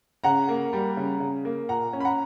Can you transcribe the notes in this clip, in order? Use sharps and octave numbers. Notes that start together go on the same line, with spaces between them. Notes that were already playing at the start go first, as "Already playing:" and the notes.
C#3 F#5 A#5
A#3
G3
C#3
C#3
A#3
A#2 F#5 A#5
C#4
B5
F#5 A#5